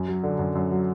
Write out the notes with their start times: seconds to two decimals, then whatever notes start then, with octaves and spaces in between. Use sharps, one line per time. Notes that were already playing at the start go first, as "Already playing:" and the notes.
Already playing: F#2
0.08 F#3
0.23 D3
0.39 F#2
0.55 F#2
0.71 F#3